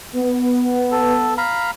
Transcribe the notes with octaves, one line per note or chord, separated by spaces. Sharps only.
B3
A4
F5 A#5 B5